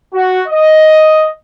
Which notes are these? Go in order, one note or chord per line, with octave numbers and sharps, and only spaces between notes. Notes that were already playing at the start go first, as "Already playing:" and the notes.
F#4
D#5